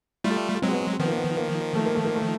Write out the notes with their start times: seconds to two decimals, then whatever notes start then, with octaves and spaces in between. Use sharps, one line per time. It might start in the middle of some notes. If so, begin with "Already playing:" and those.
0.24 G3 A3 F4
0.62 F#3 G#3 C4
0.71 B3
0.79 C4
0.99 D#3 F3 B3
1.07 A#3
1.16 B3
1.37 A#3
1.75 A3
1.86 A#3
1.95 A3
2.05 A#3
2.15 A3